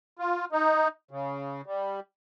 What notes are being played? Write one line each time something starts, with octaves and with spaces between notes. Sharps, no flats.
F4
D#4
C#3
G3